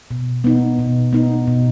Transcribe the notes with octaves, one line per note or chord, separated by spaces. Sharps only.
B2
B3 D#4
B2
B3 D#4
B2